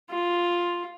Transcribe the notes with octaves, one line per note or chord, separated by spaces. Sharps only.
F4